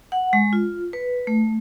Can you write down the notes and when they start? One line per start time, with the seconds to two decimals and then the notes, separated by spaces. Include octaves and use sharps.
0.12 F#5
0.33 G#3
0.53 F4
0.93 B4
1.27 A3